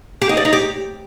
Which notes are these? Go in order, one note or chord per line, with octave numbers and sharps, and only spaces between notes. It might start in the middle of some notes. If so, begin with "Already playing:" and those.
G4
D#4
D5
D#4
G4